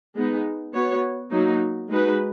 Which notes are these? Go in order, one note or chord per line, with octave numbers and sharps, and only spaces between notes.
G#3 B3 D#4
B3 F#4 C#5
F#3 A#3 D#4
G#3 D#4 F#4 B4